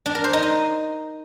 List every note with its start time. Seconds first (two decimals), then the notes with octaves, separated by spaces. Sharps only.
0.06 D4
0.15 A#4
0.24 C5
0.33 D#4
0.42 D#5